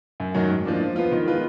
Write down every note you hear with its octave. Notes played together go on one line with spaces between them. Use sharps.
F#2
D#3 F#3
G#2
F3 A#3 D4
F3
B3 F4
D#3
G#3 B3 F4 B4